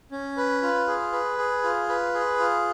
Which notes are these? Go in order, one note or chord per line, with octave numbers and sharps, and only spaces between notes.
C#4
B4
F4
G#4
B4
G#4
F4
B4
G#4
F4